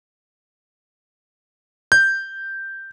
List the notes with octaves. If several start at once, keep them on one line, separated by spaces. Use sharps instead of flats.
G6